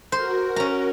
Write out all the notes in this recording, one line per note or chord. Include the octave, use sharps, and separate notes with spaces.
F#4 A#4 C5
C#4 A#5